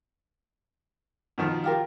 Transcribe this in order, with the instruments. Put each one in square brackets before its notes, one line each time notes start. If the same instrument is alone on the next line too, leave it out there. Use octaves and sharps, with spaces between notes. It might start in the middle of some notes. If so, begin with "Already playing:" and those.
[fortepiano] B2 D#3 F3
[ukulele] F4 G4 A#4